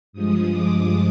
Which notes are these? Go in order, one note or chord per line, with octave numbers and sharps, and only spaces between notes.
G2 F3 G#3 D#6
D6